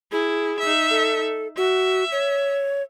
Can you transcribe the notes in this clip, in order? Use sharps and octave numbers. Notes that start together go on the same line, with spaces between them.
E4 G#4
D#4 E5
A4
F#4 E5
C#5